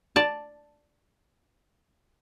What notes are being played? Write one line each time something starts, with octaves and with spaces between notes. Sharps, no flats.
D5 A5